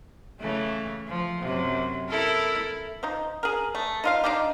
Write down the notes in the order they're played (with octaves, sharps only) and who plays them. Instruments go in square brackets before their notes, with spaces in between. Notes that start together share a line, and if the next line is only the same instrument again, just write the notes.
[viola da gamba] C#3 E3 A3
F3
F#2 C3
E4 A4 A#4
[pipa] F3 D#4
G#4 A#4
A3
D#4 F4 F5
D4 D#4 F4 G4